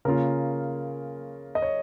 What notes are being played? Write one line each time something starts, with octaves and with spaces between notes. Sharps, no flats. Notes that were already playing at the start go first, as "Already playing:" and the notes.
C#3 A#3 C#4 F4 A#4
D#5
C#5